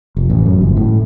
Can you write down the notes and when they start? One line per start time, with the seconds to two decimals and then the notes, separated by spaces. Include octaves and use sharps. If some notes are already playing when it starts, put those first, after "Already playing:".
0.17 F1
0.30 A1
0.46 F#2
0.61 G1
0.77 A2